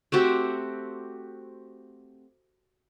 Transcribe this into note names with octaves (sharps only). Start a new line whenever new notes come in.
A3 C4 F#4 G4